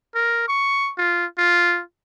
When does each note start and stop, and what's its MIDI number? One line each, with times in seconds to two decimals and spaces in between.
0.15 0.45 70
0.48 0.91 85
0.98 1.26 65
1.38 1.81 65